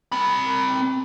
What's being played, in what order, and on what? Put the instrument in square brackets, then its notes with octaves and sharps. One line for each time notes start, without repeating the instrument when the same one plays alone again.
[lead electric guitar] C4 B5